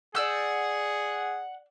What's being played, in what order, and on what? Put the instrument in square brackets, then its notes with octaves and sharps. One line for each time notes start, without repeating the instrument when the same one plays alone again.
[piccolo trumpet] G#4 [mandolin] D5 E6 G6 [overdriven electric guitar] F#5